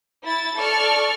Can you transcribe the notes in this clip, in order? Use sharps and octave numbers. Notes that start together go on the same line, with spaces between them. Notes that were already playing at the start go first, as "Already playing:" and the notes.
E4 A6
A4 D5 C#6 F6